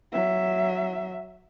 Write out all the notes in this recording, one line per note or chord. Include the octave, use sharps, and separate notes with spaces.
F#3 E5